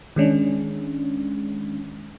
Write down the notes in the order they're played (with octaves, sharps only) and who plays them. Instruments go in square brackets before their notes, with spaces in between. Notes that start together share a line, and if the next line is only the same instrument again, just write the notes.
[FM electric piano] D#3 G#3 C#4 D4